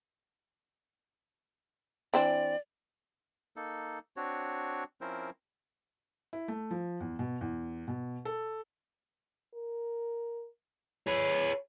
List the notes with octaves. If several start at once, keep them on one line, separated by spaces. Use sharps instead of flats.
E3 C4 D4 D5
A#3 D#4 A4
C4 D4 F#4 C#5
F3 C4 C#4 E4 A#4 C5
E4
A3
F3
E2
B2
E2
B2
A4
A#4
G#4 B4 C#5